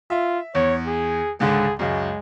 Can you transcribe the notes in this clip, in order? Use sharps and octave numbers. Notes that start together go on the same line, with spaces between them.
F4 E5
E2 C#5
G#4
C#2 G#2 D3 G#4
C#2 F#2 G#3